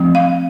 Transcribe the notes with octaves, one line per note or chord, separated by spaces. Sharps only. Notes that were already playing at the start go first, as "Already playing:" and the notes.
Already playing: F3 A3 C4
F5